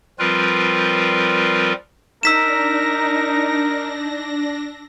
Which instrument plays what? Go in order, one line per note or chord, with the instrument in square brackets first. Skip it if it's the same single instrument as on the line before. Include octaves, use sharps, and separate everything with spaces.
[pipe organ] F3 G3 C4 F4 A#4 B4
[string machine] D4 A#6 [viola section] D#4 [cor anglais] A#4 [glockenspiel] E6 B6 E7